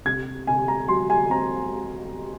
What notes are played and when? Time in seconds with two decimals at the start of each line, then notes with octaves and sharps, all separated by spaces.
0.05 C3 G#6
0.47 C3 G#5
0.68 A#5
0.88 F#3 C6
1.10 G#5
1.30 C4 A#5